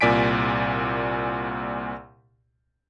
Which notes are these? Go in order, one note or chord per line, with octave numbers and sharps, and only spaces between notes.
C2 A#2 D5 G#5 B6 D7